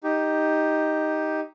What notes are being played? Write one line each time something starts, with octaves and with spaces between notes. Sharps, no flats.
D#4 G4